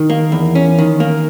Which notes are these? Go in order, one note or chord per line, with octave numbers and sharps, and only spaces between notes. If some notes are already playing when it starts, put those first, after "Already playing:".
Already playing: D#3
A#3
E2
C#4
D#3
A#3